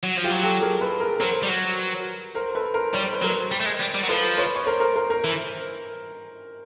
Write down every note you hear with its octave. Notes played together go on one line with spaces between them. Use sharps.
F#3
F3
F4 G4
F#3
G4 A4
G#4 A#4
A4 B4
G#4 A#4
F#3 A#4 C5
G3
F#3
A#4 C5
A4 B4
A#4 C5
G3 C#5
C5
B4
F#3 A#4 C5
G3
A3
G#3
G3
G3
F#3
F3 A4 B4
B4 C#5
C#5
A#4 C5
A#4 C5
A#4 C5
A#4 C5
E3